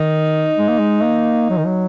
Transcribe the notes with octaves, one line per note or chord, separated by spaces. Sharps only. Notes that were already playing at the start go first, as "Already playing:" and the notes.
Already playing: D#3 D#4
G#3
A#3
G#3
A#3
F#3
D#3
F#3